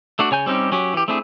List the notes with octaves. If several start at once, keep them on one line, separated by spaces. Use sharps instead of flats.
A3 D4 F#4
C#3 C#5 G#5 G6
G3 C4 C#4 D#4 G4
F#3 C#4 G4
E3 G4
A3 C4 D4 E4 G#4